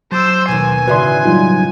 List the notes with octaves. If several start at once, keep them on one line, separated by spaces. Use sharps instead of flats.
F#3 C5 A5 D6 E6 E7
D#2 B2 G#5
A1 C#3 F#4 B4 D5 E5 C6
F#3 G3 D#4 F4